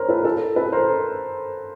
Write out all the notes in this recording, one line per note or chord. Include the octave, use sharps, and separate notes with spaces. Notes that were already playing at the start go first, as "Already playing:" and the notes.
Already playing: A#4 C5 C#5
A4 B4
A#4
A4 B4
A4 B4
A#4 C5